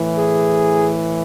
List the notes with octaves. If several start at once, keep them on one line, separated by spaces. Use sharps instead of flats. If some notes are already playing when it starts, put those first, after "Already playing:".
Already playing: A2 E3
G#4